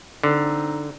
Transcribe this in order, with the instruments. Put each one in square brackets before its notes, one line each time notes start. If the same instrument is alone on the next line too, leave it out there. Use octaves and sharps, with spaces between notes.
[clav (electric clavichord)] D3 [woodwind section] C4 D#4